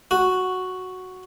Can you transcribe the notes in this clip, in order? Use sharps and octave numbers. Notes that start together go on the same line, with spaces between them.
F#4